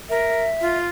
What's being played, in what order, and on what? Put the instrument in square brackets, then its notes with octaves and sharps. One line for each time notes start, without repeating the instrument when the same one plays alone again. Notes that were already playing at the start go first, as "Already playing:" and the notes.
[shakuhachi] A#4 [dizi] E5
[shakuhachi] F4